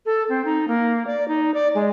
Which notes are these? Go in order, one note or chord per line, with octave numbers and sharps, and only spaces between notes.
A4
C4
D#4
A#3
D5
D#4
D5
G#3